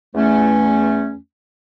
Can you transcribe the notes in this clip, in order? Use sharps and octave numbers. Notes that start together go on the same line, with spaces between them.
E2 A3 C#4